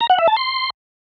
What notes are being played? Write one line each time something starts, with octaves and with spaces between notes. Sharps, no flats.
A#5
F#5
E5
A5
C6